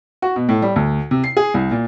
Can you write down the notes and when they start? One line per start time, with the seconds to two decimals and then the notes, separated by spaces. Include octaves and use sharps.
0.22 F#4
0.36 B2
0.49 A2
0.62 G3
0.76 D2
1.11 C3
1.24 C7
1.37 G#4
1.54 C2
1.71 A#2